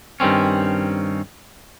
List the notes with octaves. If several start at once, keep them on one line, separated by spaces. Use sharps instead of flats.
G2 D#3 C4 C#4